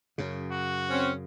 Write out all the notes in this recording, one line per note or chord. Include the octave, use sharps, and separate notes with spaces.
F#2 C#3
F#4
C4 C#4